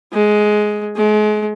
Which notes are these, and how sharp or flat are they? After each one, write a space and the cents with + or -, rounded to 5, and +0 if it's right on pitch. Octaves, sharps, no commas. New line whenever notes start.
G#3 +10
G#3 +35